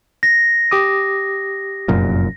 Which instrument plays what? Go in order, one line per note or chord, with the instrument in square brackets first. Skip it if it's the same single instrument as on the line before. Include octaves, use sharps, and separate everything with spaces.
[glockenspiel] A#6
[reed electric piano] G4 D6 D#6
[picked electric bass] F1 F#2 A#2